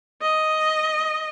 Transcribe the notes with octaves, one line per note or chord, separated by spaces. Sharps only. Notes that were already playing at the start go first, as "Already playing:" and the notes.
D#5